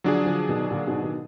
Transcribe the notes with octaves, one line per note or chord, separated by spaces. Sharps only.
D3 F3 F#3 D4 G#4
D3 F3
B2 D#3
A#2 D3
G#2 B2
B2 D#3